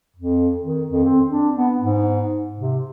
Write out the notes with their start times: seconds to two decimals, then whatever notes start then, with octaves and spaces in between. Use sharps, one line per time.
0.16 F2
0.63 D#3
0.91 F2
1.04 C4
1.29 D4
1.55 B3
1.81 G#2
2.58 C3